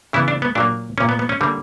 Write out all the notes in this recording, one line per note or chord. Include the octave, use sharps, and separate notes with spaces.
C#3 E3 B3 E4
D4
B3
A#2 F#3 A#3 D4
A#2 A#3 C#4
B3
B3
C#4
D3 G3 A#3